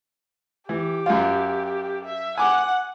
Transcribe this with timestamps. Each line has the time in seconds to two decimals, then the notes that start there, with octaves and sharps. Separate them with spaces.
0.69 E3 G4
1.06 F#2 F4
2.05 E5
2.38 F#5 G#5 D6